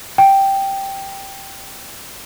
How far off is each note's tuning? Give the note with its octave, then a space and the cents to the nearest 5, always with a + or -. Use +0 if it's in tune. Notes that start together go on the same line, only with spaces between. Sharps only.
G5 -5